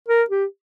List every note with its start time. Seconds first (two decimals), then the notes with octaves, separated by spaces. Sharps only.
0.08 A#4
0.30 G4